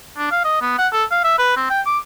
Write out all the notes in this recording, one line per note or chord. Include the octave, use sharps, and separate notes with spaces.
D4
F5
D#5
B3
F#5
A4
F5
E5
B4
C4
G5
D6